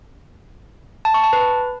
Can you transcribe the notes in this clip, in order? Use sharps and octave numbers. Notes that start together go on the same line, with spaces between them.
A5
C#6
A5
B4